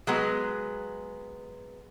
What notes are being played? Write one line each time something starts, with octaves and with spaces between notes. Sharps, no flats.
F#3 G#3 B3